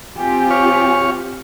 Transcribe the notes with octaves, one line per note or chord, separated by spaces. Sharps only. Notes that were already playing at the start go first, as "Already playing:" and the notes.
C4 F4 G4 G#5
C#5 F5